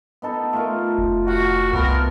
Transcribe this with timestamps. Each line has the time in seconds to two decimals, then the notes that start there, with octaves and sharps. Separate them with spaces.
0.22 B3 D#4 A4
0.53 A3 F4 A#4
0.98 F1
1.27 F#4 F5 F#5
1.73 C2 B3 C4 A4 A#4